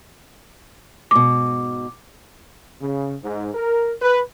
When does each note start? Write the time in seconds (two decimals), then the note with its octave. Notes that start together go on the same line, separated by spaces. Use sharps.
1.11 G#2 B2 D6
2.81 C#3
3.23 G#2
3.55 A#4
4.02 B4